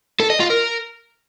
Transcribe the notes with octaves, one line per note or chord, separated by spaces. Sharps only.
A4
D#5
F4
A#4